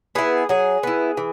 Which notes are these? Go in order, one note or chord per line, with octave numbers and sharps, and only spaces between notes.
B3 E4 G#4
F#3 G#4
B3 E4
E3